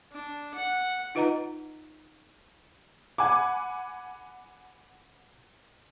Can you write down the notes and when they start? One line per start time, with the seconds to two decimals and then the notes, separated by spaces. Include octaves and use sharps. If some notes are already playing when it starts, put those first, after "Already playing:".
0.12 D4
0.54 F#5
1.15 D#4 F4 B4 D#5 F#5 A#5
3.18 F#5 G#5 B5 D6